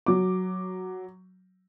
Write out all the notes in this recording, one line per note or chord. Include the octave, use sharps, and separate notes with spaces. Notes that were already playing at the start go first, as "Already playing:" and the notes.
F#3 D6